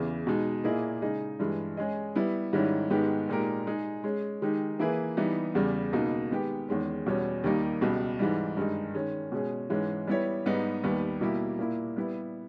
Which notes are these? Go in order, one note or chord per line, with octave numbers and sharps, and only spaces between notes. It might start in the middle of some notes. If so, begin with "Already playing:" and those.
Already playing: E2 C#3 E3
B2 G#3 D#4
A#2 A#3 E4 G#4 D#5
C#3 G#3 D#4 G#4 D#5
G2 E3 G#3
G#3 C#4 G#4 D#5
G3 B3 E4
G#2 D#3 G3 C#4 E4
G#2 D#3 G#3 B3 G4
A#2 G#3 D#4 G4 A#4
G#3 D#4 G#4
G#3 C#4 G#4
D#3 G#3 D#4 G4
E3 A#3 E4 G#4 B4
E3 G3 B3 D#4
E2 C#3 G3
C#2 B2 A#3 D#4
D#3 G#3 B3 G4
E2 D#3 G#3 C#4
E2 B2 G3 C#4
D#2 D#3 G3 A#3 D#4
C#2 B2 G3
G#2 E3 G3
G2 D#3 G#3 D#4
D#3 G#3 C#4
B2 G#3 C#4 G#4
G#2 E3 G#3 C#4
G3 B3 E4 G4 C#5
G#2 G3 B3 D#4
D#2 D#3 G3 B3
B2 G3 A#3 E4 G4
A#2 A#3 E4
G3 B3 E4